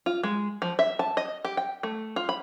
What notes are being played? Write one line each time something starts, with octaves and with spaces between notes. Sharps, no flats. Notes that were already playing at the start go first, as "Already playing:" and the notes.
F4
G#3
F3
E5
A5
D#5
G4
G5
A3
F4
B5